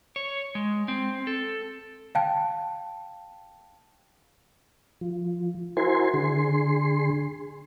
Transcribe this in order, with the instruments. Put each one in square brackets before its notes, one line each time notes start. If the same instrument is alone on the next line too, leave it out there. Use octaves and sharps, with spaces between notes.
[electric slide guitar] C#5
G#3
C4
A4
[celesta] F5 G5 A5
[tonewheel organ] F3
E4 F#4 A#4 C5 G#5 C6
D3 G#4 C6